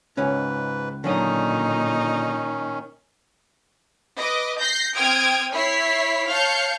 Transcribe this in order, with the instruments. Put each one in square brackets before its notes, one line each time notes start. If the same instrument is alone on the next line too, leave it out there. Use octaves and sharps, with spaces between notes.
[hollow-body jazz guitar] C#2 C#4 [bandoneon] G#2 B4
[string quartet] A#2 D#4 [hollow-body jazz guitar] D3 F#3 D#5 [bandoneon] D#3 C#4
[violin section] B4 D#5 D6
G6 A#6 C7
C4 G5 D#6 F6 G#6 D7
E4 C#5 B6 C7
C#5 F5 A5 G6 C7 C#7